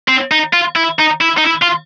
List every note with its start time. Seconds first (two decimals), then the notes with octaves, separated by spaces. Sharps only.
0.08 C4
0.31 D#4
0.53 F4
0.76 E4
0.99 D#4
1.21 E4
1.38 D#4
1.45 E4
1.62 F4